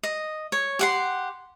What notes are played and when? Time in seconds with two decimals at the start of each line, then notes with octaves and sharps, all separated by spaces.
0.03 D#5
0.52 C#5
0.79 G4 F#5 C6